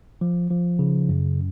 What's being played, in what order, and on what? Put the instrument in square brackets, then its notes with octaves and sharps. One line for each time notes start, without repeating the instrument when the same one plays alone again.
[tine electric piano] F3
F3
C#3
F#2